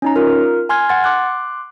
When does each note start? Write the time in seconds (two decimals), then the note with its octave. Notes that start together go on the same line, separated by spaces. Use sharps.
0.02 C#4 D#4 A#5
0.16 F4 A#4
0.69 G#5 C6 F6 G#6
0.89 F#5 C6 A6
1.04 C6 D6 F#6